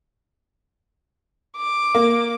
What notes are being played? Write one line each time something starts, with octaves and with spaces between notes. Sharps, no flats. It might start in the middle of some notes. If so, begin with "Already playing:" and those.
D6
A#3